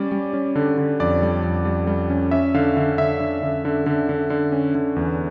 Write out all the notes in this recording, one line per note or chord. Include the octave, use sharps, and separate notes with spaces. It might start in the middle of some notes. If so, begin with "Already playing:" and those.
Already playing: G3 C#4 D5
G3
C#4
D3
D3
F2 D5
G3
F2
G3
G3
C#4
C#4 E5
D3 F5
D3
D3 E5
D3
D3
D3
D3
D3
D3
C#4
D3
E2